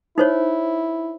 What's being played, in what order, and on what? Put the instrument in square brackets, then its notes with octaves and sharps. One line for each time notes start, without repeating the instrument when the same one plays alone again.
[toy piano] D#4 C5 C#5 [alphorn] E4